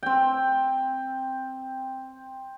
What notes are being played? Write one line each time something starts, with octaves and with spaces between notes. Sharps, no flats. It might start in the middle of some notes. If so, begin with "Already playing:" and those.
C4 G5